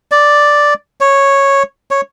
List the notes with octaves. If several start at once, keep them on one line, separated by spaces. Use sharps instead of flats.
D5
C#5
C#5